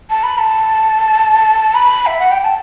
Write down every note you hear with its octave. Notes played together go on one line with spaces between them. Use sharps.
A5
B5
A5
B5
E5
F#5
G5
A5